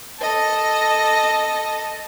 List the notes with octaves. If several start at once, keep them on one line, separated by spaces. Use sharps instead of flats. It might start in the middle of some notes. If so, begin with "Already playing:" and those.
A4 D#5